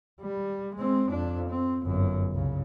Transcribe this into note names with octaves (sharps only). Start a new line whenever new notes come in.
G3
G#3 C4
F2 D4
C4
G1 F#2
C2 C#3